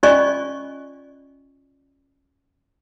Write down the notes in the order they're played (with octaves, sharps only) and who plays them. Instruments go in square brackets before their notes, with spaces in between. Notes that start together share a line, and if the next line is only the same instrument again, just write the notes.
[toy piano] C#4 F4 D5 D#5 G#5 C#6